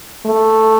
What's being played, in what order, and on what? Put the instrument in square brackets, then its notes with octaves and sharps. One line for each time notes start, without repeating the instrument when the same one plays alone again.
[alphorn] A3